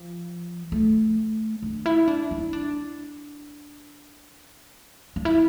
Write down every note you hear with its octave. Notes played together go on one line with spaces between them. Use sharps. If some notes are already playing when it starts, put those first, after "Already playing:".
Already playing: F3
A3
D4
E4
D4
E4
D4
D4
E4